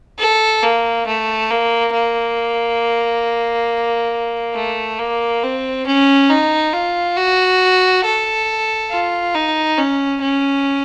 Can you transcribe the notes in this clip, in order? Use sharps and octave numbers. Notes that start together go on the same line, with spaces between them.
A4
A#3
A3
A#3
A#3
A3
A#3
C4
C#4
D#4
F4
F#4
A4
F4
D#4
C#4
C#4